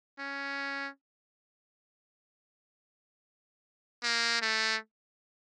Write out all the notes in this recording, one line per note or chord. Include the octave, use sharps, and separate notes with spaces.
C#4
A#3
A3